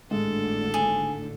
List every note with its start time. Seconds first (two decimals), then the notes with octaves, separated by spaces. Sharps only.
0.11 G#1 A2 D3 G#3 A4
0.74 G#4